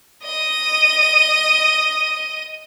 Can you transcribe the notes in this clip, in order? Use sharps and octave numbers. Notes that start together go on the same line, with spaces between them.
D#5 D#7